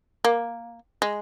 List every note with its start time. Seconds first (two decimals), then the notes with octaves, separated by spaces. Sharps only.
0.25 A#3
1.02 G#3